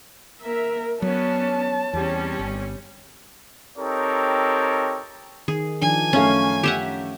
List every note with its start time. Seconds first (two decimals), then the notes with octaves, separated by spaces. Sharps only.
0.41 A#3 A#4 E5
1.02 F#3 B3 C#4 D4 C#5 A5
1.93 E2 G3 C4 C#4
2.39 G1
3.78 C4 D#4 G4 A4 A#4 C#5
5.48 D#3 G#4
5.82 D#3 F3 D4 G#5
6.13 F#2 A3 C#4 C#5 F5
6.63 G4 E5 F#5